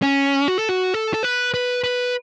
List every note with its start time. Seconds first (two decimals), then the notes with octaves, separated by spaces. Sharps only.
0.02 C#4
0.48 F#4
0.58 A4
0.69 F#4
0.94 A4
1.14 A4
1.23 B4
1.54 B4
1.84 B4